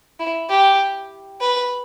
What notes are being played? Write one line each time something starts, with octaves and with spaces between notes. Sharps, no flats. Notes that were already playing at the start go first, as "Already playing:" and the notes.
E4
G4
B4